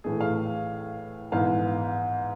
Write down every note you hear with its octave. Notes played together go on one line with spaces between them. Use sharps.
A2 E3 A3 G#4
F5
G#2 E3 B3 F5